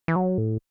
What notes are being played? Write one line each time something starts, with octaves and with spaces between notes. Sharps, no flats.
E3
F#3
A2